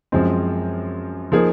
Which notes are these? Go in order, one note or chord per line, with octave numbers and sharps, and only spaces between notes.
F#2 F3 G#3 C4
F3 A#3 D#4 G#4